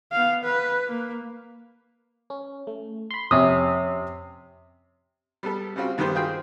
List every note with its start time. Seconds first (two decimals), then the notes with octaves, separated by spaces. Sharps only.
0.12 B3 F5
0.44 B4
0.88 A#3
2.30 C#4
2.67 A3
3.11 B5 C6
3.31 F2 C3 C#4 D#6
5.43 G3 B3 A4
5.76 C#3 G3 C4 F4 F#4
5.98 G2 D#3 B3 G4 C5
6.15 F4 F#4 G#4 C5 G5